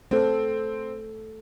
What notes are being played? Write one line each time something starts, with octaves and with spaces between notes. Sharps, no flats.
A3 C4 A4